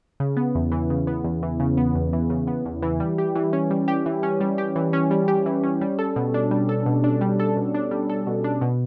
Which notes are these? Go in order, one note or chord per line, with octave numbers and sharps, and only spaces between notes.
C#3
B3
E2
E3
C#3
B3
E2
E3
C#3
B3
E2
E3
C#3
B3
E2
E3
G3
G4
E3
C#4
G3
G4
E3
C#4
G3
G4
E3
C#4
G3
G4
E3
C#4
G3
A4
B2
D4
G3
A4
B2
D4
G3
A4
B2
D4
G3
A4
B2
D4
B2